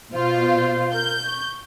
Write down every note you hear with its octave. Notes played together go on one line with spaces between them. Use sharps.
B2 F4 C5
A#4 G6
C#6